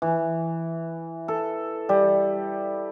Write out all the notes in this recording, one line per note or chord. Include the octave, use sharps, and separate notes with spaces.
E3
A4
G3